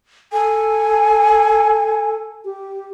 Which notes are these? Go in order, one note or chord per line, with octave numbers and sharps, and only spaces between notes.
A4 G#5
G4